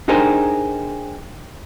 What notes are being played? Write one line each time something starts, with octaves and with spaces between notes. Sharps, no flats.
D4 D#4 G4 G#4 A#4 C5